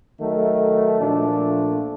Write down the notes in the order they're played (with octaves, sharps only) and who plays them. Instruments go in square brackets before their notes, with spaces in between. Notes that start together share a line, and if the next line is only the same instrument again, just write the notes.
[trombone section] D#3 F#3 A3
A#2 F3 A3 D4